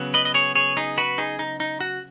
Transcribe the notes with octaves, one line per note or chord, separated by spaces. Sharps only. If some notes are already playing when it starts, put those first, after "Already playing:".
Already playing: C#3 F#3 B3
B4 D#5
D#5
G#4 C#5
G#4 C#5
D#4 G#4
F#4 B4
D#4 G#4
D#4
D#4
F#4